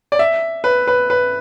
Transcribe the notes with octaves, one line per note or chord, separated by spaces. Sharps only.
D5
E5
B4
B4
B4